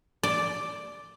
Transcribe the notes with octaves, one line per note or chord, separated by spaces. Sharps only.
D5